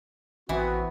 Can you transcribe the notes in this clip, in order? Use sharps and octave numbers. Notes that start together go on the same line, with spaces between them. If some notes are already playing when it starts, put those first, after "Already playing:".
A1 E3 B3 C4 F#4